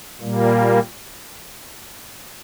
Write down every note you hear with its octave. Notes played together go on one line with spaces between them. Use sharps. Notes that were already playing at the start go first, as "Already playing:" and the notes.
A#2 G3 A#3